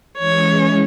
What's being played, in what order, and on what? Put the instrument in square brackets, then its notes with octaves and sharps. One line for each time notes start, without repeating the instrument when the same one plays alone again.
[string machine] E3 G#3 C#4 [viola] C#5